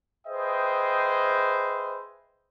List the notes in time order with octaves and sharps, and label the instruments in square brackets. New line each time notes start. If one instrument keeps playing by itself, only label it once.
[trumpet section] G#4 B4 C5 D#5 E5 G5